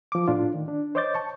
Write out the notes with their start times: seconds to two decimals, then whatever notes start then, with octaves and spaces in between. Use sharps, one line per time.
0.12 F3 D6
0.28 A2 D4 F4
0.55 D#3
0.68 D4
0.95 C5 C#5 D#5 D6 G6 A6
1.15 A5 C#6